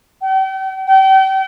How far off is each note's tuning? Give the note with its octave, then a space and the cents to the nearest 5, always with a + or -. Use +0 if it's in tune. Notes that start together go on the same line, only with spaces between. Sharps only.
G5 -40
G5 -35